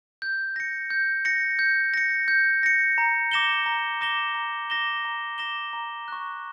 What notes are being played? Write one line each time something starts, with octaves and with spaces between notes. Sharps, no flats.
G6
A#6 C#7
G6
A#6 C#7
G6
A#6 C#7
G6
A#6 C#7
A#5
D6 A#6 E7 G7
A#5
D6 A#6 E7 G7
A#5
D6 A#6 E7 G7
A#5
D6 A#6 E7 G7
A#5
C#6 F#6